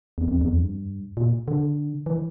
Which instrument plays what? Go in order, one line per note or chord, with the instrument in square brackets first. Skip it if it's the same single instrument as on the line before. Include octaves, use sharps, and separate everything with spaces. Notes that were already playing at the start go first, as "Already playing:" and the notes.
[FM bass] E2
F2
E2
F2
G2
A#2
D3
E3